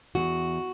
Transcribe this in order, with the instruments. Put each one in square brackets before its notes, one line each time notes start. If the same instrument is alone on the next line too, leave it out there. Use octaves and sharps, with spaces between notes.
[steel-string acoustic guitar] E2 F#4